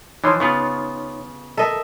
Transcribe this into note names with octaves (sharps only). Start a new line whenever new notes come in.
E3 F3 D#4 C#5 C6
C#3 B3 F4
A4 A#4 D#5 E5